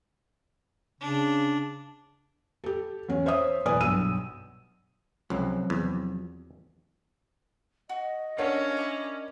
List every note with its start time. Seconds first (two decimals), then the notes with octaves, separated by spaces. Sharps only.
1.01 C#3 D4
2.64 G4 A4
3.09 E2 C#4
3.26 C5 C#5 E5 D#6
3.65 E1 E3 B4 D5 G#5 D#6
3.80 B1 G2 E6 D#7
5.30 C#2 C3 F3 F#3
5.70 E2
7.89 F#4 D#5
8.38 C#4 D4 F4 F#4 A4 A#4 C#5
8.77 E4 C5 D6